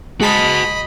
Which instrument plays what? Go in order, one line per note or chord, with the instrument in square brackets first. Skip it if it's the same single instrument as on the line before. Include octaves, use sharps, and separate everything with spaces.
[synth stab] G#3 G#4 B6 [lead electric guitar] F#4 A5 [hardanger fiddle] D#5 B5